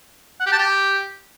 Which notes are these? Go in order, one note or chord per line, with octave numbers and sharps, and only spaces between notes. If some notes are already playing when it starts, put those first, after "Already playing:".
F#5
G4
A5
G4